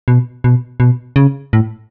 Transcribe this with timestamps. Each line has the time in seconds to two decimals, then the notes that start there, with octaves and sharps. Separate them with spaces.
0.08 B2
0.44 B2
0.80 B2
1.16 C#3
1.53 A2